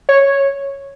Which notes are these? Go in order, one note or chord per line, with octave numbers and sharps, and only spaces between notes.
C#5